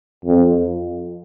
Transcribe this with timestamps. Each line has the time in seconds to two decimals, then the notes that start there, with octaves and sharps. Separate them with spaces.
0.25 F2